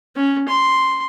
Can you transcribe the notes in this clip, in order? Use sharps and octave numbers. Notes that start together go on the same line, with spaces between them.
C#4
C6